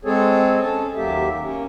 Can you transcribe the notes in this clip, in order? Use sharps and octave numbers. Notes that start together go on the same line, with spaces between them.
G#3 C4 G#4 A4 C#5
C#4 A4 A5
D#2 F#3 A#3 G4 E5
A#3 C#4